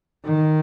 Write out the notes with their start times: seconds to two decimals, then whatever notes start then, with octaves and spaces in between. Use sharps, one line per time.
0.25 D#3